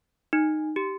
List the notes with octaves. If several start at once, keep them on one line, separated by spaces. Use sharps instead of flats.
D#4
G4